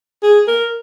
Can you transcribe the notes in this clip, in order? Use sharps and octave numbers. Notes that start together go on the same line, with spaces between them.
G#4
A#4